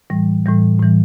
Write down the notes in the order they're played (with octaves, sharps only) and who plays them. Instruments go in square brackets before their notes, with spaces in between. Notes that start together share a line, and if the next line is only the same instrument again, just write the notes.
[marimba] A2 E3 G3
A2 E3 G3
A2 E3 G3